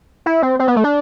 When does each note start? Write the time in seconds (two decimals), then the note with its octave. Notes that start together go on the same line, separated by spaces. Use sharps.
0.26 E4
0.42 C4
0.59 C4
0.68 B3
0.76 A3
0.84 D4